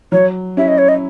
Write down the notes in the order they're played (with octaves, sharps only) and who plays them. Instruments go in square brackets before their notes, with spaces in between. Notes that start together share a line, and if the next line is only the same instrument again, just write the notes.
[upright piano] F#3 [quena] C#5
[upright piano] C#4 E4 [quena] E5
[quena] D#5
C#5
D#5